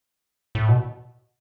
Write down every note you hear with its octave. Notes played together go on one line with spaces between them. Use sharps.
A2
B2